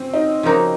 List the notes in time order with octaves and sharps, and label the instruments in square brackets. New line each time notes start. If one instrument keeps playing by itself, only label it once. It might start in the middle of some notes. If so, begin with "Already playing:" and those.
Already playing: [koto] C#3 [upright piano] C4 C#4
[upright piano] D#4
[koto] C#3 F3 A#3 D#4 F#4 [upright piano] C#4